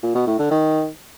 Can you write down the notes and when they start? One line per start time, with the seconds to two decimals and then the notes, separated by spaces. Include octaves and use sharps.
0.03 A#2
0.15 B2
0.27 A2
0.39 D3
0.51 D#3